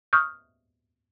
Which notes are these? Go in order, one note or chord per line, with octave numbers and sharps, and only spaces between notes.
C#6 D#6 F6 G6